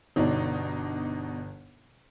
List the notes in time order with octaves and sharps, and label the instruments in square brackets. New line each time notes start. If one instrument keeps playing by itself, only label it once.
[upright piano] G1 [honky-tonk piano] B2 D4 D#4